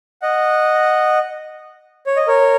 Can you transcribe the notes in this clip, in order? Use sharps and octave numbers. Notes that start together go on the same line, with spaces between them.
D#5 F#5
C#5
D#5
A#4 C#5